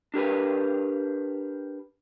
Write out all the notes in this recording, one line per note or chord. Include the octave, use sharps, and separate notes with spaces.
D4 G4 A#4 B4